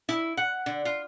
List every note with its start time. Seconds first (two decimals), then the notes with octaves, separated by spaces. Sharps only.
0.09 E4
0.37 F#5
0.66 D3
0.85 F4